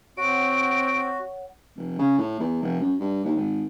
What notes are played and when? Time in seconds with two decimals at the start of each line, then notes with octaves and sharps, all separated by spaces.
0.17 C4 F#4 C#5 F#5 D7
1.77 F1
1.99 C#3
2.18 A2
2.40 E2
2.63 F1
2.80 F#2
2.99 G2
3.24 D#2
3.37 G#1